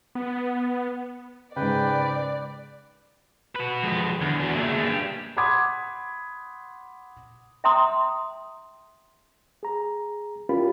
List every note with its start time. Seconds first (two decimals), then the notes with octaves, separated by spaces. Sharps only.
0.15 B3
1.56 G#2 C#3 B4 D5 G5
3.55 F#4 B4
3.83 F3 G#3 A4
4.22 E2 D3
4.40 D4 F#4
4.55 C#2 A3 A#3 G#4
4.84 G2 G4
5.37 F#5 B5 C6 D6 D#6 G#6
7.64 E5 G5 A#5 C6 D#6
9.63 G#4 A#5
10.49 C#4 E4 F4 G4 A#4 B5